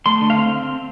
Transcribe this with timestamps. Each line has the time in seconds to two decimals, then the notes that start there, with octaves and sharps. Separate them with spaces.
0.06 A3 C6
0.21 D3
0.30 F5
0.37 C4